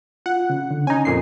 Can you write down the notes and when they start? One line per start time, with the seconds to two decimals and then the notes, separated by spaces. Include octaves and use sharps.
0.26 F4 F#5
0.50 C#3
0.71 D3
0.87 C#4 D#4 G#5
1.05 F2 A#2 C7